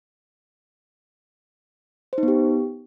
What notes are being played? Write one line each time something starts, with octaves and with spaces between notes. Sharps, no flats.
C5
D#4
B3
G4